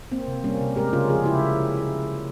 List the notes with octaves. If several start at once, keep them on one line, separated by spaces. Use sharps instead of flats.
A#3 C4
C3
G3 A#3 C#4
C3
G#3 G4 A#4
C#3 C#4 F4
F3 F4 G#4
C#3 E4 G4